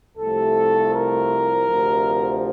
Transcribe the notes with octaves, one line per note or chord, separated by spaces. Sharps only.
C2 C3 F3 A3 A4
A#4
D2 C3 F3